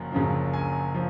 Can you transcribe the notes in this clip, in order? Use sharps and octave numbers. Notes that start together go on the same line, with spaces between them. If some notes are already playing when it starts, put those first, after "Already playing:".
Already playing: F#1 F#2 F3
F#1 F#2 C#3 F3
G#5
F3